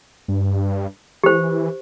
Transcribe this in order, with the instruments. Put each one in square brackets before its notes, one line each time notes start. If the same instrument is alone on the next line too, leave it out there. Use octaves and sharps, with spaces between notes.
[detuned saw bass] G2
[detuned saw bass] E3 [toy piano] G4 C5